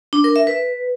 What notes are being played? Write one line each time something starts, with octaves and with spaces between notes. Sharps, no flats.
D4
A#4
E5
B4